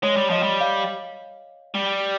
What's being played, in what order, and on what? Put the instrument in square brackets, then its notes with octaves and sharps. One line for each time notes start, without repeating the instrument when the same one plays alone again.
[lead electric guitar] G#3 [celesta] C#5
[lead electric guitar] G3
[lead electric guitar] F3 [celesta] D#5
[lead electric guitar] G3
[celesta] F5
[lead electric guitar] G3